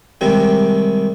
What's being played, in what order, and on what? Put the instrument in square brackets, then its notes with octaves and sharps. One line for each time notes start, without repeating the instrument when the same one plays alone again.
[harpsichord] C3 D#3 G3 G#3